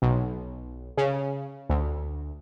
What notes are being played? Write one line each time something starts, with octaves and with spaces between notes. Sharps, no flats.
B1
C#3
D2